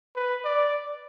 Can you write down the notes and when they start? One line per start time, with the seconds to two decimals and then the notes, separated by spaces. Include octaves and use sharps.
0.16 B4
0.44 D5